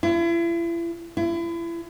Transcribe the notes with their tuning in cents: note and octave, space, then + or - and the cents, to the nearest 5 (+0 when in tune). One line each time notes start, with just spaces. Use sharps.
E4 +40
E4 +35